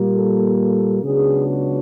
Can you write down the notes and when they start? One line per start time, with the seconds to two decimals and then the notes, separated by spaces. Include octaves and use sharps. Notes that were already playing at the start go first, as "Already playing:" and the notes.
Already playing: A#2 G3 A#3
0.15 A4
0.60 A4
1.04 C#2 C#3 F#3 B3 D4 G#4
1.48 F#4